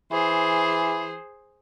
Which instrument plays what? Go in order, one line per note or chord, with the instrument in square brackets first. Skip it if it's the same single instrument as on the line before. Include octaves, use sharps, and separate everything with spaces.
[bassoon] E3 [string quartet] G#4 C5